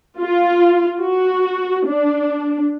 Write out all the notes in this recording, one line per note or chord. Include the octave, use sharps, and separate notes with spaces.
F4
F#4
D4